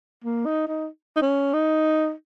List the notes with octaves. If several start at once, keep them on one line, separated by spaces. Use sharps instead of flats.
A#3
D#4
D#4
D#4
C#4
D#4